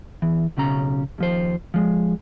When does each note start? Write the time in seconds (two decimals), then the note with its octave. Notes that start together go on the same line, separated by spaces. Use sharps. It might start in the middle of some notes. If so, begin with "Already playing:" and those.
0.22 E2 E3
0.57 B1 C#3 C#4 A#5
1.18 D#2 F3 C5
1.74 F3 G#3